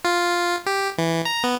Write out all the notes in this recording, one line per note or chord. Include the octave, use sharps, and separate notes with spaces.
F4
G4
E3
A#5
B3